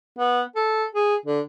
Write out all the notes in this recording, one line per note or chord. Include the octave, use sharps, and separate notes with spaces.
B3
A4
G#4
D3